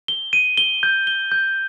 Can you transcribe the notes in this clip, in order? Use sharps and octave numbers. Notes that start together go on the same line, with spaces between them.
G7
D#7
G7
G6
G7
G6